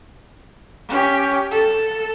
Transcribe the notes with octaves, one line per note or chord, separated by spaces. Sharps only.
C#4 G4
A4